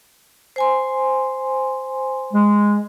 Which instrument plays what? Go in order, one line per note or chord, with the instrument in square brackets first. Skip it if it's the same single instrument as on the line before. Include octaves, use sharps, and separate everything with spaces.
[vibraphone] C5 G#5 C6
[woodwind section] G#3